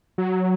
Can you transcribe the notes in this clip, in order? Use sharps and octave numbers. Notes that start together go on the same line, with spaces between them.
F#3